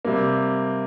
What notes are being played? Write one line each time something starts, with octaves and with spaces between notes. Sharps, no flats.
C3 G3 A#3